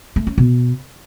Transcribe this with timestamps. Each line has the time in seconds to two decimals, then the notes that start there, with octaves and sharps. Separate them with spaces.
0.16 A3
0.27 C#4
0.38 B2